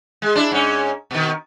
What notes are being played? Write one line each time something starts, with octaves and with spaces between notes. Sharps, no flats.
G#3
D4 E4
G#2 C#4
B2 D#3